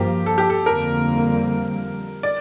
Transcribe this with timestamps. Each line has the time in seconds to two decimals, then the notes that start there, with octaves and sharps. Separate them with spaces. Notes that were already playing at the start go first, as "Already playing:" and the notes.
Already playing: G2 F3 A#3 G4
0.26 A4
0.38 G4
0.50 A4
0.66 F2 D3 G3 A#3 A#4
2.23 D5